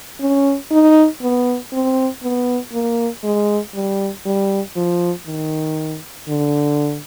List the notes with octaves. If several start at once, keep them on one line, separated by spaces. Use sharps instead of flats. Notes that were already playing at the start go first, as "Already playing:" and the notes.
C#4
D#4
B3
C4
B3
A#3
G#3
G3
G3
F3
D#3
D3